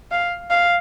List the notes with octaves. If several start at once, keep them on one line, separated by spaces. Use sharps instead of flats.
F5
F5